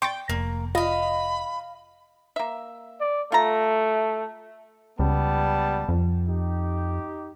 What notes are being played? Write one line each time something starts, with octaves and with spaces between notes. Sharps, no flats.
G5 C6 C#6 A6
F1 A#3
F4 D#5 F5 B5
A#3 E5
D5
A3 F4 A#5
C#2 G3 B3 A5
F2
D#4 G4